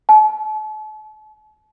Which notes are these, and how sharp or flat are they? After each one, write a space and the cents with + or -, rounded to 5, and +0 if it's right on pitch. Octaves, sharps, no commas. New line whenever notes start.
A5 -40